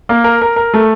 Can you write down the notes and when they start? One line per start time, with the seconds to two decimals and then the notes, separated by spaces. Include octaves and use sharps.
0.09 A#3
0.24 A#4
0.42 A#4
0.56 A#4
0.74 A3